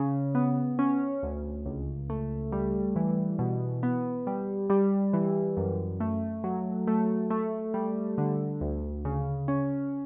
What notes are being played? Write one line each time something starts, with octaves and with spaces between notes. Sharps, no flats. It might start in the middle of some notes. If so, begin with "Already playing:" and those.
Already playing: C#3
B3
C#4
D2
C#2
A3
G3
E3
B2
B3
G3
G3
E3
F#2
A3
F#3
A3
A3
G3
D3
D2
C#3
C#4